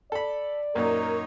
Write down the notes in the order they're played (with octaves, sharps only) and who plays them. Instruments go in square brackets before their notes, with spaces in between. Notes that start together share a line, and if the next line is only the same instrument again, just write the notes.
[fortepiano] A4 B5 [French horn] D5
[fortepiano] F#2 A#2 [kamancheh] D#4 C#5 [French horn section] A#4